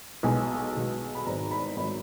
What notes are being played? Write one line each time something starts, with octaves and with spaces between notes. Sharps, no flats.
B1 B2 G#3 G#5
B1 B2 G#3
B5
G#1 G#2 F#3 A#5
B5
G#1 F#3 B5